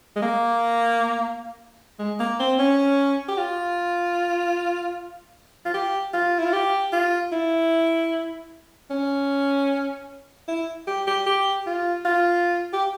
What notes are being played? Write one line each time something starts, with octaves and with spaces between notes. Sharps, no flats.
G#3
A#3
G#3
A#3
C4
C#4
G4
F4
F4
G4
F4
E4
F4
G4
F4
E4
C#4
E4
G4
G4
G4
F4
F4
G4